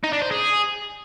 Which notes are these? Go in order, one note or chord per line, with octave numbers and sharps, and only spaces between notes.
D#4
D4
C5
G#4